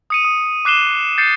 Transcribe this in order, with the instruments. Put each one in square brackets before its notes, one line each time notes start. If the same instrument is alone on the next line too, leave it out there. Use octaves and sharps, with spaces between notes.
[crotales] D#6 C#7 D#7
D#6
D6 F#6 C7 E7 G7
G6 A6 C7 C#7